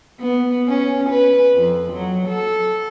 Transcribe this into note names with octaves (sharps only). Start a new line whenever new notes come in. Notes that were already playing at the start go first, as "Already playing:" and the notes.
B3
C#4
B4
F2
F#3
A4